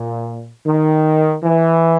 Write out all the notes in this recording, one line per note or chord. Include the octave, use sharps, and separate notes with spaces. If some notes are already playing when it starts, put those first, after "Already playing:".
Already playing: A#2
D#3
E3